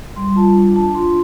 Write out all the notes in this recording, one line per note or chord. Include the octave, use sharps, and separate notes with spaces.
G3 C6
F4 A5
D4
D4 A5
F4 C6